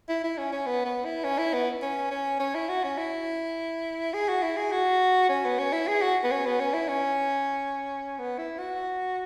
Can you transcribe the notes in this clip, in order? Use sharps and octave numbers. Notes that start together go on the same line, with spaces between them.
E4
E4
C#4
C#4
B3
B3
E4
C#4
E4
B3
C#4
C#4
C#4
E4
F#4
C#4
E4
G#4
F#4
E4
G#4
F#4
C#4
B3
C#4
E4
G#4
F#4
B3
C#4
B3
C#4
E4
C#4
B3
E4
F#4